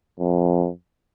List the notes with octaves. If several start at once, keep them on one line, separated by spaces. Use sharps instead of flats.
F2